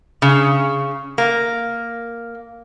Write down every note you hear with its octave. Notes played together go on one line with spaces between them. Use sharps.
C#3
A#3